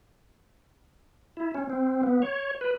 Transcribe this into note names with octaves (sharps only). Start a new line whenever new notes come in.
E4
C#4
C4
B3
C#5
B4